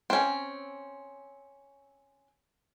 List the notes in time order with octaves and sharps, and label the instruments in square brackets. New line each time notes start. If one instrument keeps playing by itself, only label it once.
[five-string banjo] C4 C#4